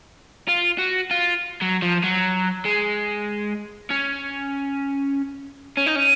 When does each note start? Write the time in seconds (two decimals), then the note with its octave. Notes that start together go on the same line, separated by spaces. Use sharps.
0.49 F4
0.79 F#4
1.11 F4
1.61 F#3
1.82 F3
2.04 F#3
2.65 G#3
3.90 C#4
5.77 C#4
5.86 D#4
5.96 C#4